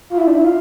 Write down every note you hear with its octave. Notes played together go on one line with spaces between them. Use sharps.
F4
E4
D4
E4
F4